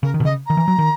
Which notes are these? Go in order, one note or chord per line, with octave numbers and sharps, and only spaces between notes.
C#3 A#4
D#3
B2
C#3 D#5
D#3 A#5
E3
F#3
D#3